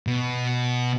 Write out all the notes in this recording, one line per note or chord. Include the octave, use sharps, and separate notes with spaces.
B2